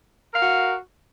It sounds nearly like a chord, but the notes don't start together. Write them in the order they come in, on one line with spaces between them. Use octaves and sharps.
A#4 F5 F#4